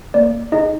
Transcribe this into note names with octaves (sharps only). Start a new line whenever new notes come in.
A#3 D5
D#4 G#4 D#5